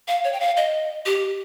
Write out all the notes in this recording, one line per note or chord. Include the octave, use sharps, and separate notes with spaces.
F5
C#5
G5
F5
D#5
G4